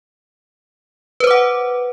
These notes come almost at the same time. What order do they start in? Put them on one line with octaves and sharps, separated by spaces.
B4 C5 D6 F#5